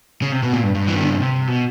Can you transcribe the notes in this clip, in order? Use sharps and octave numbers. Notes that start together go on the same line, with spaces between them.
C#3
C3
B2
A#2
G2
G2
E3
D#3
D3
C#3
C3
B2